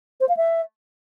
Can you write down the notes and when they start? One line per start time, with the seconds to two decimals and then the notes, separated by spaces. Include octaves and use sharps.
0.21 C5
0.29 F5
0.37 E5